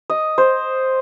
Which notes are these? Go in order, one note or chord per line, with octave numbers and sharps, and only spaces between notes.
D#5
C5